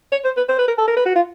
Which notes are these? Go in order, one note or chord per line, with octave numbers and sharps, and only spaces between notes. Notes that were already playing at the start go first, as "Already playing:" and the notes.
C#5
C5
B4
C5
B4
A#4
A4
A#4
B4
F#4
F4